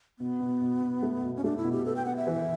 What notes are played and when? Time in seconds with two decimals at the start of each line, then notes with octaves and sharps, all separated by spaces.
0.19 B2 B3
0.40 B2
0.61 B2
0.82 B2
1.02 A3
1.23 B2
1.37 C#4
1.44 A3 D4
1.57 E4
1.64 B2
1.72 G4
1.85 B3 A4
1.96 G5
2.06 B3 F#5
2.17 E5
2.27 E3